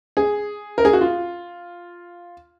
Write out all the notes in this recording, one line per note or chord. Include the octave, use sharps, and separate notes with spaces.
G#4
A#4
G#4
F#4
F4